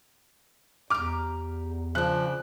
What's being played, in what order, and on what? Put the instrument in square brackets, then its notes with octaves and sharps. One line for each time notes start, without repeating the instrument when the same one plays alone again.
[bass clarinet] E2 [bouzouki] G4 A#5 [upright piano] D6 F6
[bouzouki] C#3 D4 [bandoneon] F3 [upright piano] F#6